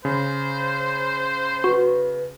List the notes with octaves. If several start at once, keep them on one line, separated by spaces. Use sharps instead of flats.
C#3 C5
F#4 B4